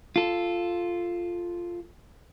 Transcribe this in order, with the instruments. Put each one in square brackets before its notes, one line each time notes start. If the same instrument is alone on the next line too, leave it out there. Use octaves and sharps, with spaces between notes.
[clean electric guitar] F4 A4